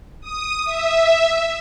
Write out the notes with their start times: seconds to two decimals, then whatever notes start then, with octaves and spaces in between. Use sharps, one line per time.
0.21 D#6
0.65 E5